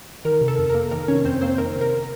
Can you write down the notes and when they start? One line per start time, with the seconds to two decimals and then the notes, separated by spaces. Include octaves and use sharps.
0.25 D#3 A#4
0.41 C3
0.48 A4
0.59 F2
0.70 A#3 A#4
0.91 D#3 A#4
1.08 C3 C#4 C#5
1.25 F2 C4 C5
1.41 A#3 C4 C5
1.58 D#3 A#4
1.76 C3
1.81 A#4